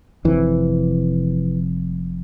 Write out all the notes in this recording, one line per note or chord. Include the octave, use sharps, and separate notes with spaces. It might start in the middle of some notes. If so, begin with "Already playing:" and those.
F1 F2 C3 E3